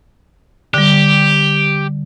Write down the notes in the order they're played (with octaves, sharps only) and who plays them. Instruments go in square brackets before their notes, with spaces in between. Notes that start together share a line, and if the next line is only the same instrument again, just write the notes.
[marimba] D3 G3 [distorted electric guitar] G4